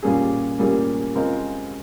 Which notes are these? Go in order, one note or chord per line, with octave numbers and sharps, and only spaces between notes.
A#2 G3 A#3 C#4 G#4
A#2 G3 A#3 C#4 G#4
C#3 G#3 C4 F4 A#4